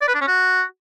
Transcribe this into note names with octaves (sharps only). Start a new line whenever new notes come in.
D5
B4
D4
C#4
F#4